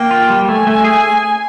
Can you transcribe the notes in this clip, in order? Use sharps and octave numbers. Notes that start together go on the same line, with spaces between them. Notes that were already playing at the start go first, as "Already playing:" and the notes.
Already playing: A#3 G5
F4
G3
A3 G#5
A3
G#4